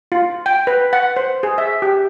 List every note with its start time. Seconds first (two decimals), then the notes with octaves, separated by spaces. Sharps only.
0.12 F4
0.46 G5
0.67 B4
0.93 F#5
1.17 C5
1.43 G#4
1.58 E5
1.82 G4